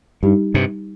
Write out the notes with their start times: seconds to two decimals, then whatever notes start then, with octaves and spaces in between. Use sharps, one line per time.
0.23 G2 G3 D#4 G4
0.54 G2 C3